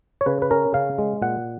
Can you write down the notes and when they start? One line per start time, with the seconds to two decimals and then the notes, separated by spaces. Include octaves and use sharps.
0.21 C#5
0.26 C#3 B4
0.42 B4
0.51 C#4 A#4
0.74 C#3 F5
0.98 G#3
1.22 A#2 F#5